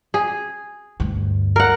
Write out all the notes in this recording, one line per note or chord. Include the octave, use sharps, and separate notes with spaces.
G#4
D2 G2
A#4 F#5